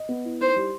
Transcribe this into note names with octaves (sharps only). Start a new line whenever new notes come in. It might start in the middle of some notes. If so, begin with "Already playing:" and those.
Already playing: D#5
B3
E4
D#4 C5
G3